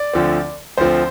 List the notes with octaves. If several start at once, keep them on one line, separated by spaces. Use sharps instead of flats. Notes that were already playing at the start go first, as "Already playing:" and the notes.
Already playing: D5
D2 D3 F3 C4
D2 D3 F3 C4 C5